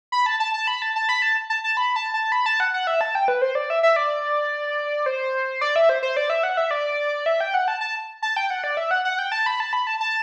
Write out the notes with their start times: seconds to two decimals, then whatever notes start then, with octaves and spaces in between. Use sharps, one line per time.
0.12 B5
0.26 A5
0.40 A5
0.54 A5
0.67 B5
0.82 A5
0.96 A5
1.09 B5
1.22 A5
1.50 A5
1.64 A5
1.77 B5
1.96 A5
2.14 A5
2.32 B5
2.46 A5
2.60 F#5
2.74 F#5
2.87 E5
3.01 A5
3.15 G5
3.28 B4
3.42 C5
3.55 D5
3.70 E5
3.83 E5
3.96 D5
5.06 C5
5.61 D5
5.76 E5
5.89 C5
6.03 C5
6.17 D5
6.30 E5
6.43 F#5
6.57 E5
6.71 D5
7.26 E5
7.40 G5
7.54 F#5
7.68 A5
7.81 A5
8.22 A5
8.36 G5
8.50 F#5
8.64 D5
8.77 E5
8.91 F#5
9.05 F#5
9.19 G5
9.32 A5
9.46 B5
9.60 A5
9.73 B5
9.87 A5
10.00 A5